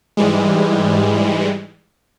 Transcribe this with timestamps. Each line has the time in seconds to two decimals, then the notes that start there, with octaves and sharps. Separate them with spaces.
0.17 G#2 E3 G3 G#3